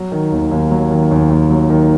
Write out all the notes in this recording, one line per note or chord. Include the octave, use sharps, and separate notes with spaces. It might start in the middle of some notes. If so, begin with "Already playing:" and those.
Already playing: F#3
D#3
D#2
D#2
F#3
D#3
D#2
D#2
F#3
D#3